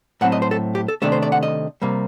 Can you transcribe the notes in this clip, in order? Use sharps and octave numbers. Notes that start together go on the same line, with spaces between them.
A2 F#3 C4 F#5
D#5
C5
A4
G4
A4
C3 D#3 A3 D4 A4
C5
D5
F#5
D#5
C3 G3 A#3